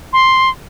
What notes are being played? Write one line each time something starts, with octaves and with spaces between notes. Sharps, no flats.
C6